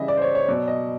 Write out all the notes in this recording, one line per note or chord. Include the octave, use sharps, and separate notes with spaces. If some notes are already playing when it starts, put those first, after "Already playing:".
Already playing: C#3 E3 G3 D#5 E5
D5
C5
C#5
C#5
B2 F#3 D5
D#5